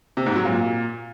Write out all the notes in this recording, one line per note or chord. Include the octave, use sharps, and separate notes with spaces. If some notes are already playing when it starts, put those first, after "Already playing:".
C3
G#2
F#3
A#2